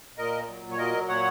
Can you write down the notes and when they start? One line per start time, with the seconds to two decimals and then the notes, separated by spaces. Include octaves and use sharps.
0.18 A#2 A#4 D#5
0.48 F#3
0.71 C#5
0.78 F#3 A#4 D#5
1.08 A#2 C#5 F#5